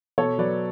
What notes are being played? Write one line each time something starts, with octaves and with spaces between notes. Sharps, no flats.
B2 A4 C#5
F#3 B4 D5